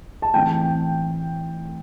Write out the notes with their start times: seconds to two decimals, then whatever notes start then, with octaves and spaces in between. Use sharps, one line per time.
0.22 A5
0.34 A2 E3 C4 G5